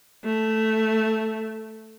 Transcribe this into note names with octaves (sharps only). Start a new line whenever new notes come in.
A3